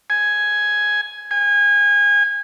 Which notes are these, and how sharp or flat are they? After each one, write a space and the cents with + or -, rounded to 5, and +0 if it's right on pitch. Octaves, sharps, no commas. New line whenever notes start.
G#5 +5
G#5 -25